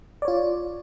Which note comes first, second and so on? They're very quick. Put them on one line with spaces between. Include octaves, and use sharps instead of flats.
D5 C#5 F4